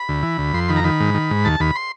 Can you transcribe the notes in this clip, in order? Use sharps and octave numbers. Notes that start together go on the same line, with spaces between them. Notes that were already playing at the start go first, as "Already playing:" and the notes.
Already playing: B5
D2
E3
D2
F2 C6
D#3 B5
A#5
D#3 B5
G#2
D#3
G#2
D#2 A5
D#2 B5
C6